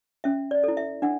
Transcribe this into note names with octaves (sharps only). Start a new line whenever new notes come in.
C#4 E5
D5
E4 A4
E5
D4 F#5